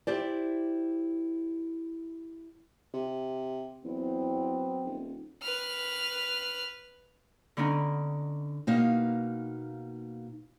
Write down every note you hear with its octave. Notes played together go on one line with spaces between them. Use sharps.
E4 G4 C5 D5
C3
E2 F#3 B3 C4
D#1
B4 F6
D3 B3 C#4 D#4
B2 A#3 D#4 F5